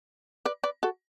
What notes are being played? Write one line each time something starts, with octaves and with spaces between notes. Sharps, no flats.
B4 D5
B4 D5
F#4 A4